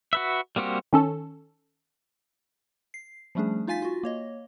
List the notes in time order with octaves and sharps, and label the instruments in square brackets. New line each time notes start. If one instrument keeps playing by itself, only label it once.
[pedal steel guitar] F#4 B4 E5
G3 A#3 C4 F#4 G4
[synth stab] D#3 C#4 A4
[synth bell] C7
F3 G3 A3 C#4 D4 G#4
D#4 F4 F5 G#5 A6 B6
F4 F#4
A#3 C#5 D#5